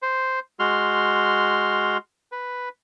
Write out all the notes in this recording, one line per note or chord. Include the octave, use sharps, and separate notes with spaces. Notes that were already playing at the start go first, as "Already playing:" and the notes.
C5
G#3 F#4 C6 F6
B4